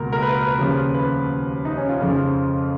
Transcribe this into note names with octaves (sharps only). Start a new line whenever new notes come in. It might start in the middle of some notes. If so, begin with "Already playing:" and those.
Already playing: C#2 B2 A#3 A#4
A#4
B4
B4
D#2 C#3 F3
B4
D#4
C#4
F4
F2 C#3 F3